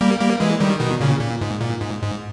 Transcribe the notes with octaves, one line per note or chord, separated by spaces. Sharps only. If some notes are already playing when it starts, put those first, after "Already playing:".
G3 A#3
G3 A#3
E3 G#3
D#3 G3
B2 D#3
A#2 C#3
A#2
G#2
A#2
G#2
G#2